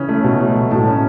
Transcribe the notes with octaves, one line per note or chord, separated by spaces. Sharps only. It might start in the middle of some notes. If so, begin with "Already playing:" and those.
Already playing: C#3 E3 C#4
A3
B2
A3
F#3
A2 A5
C#4